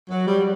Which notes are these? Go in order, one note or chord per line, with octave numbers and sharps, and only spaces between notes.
F#3
G3